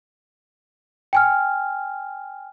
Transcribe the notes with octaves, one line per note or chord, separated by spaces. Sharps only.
G5 G#5 F6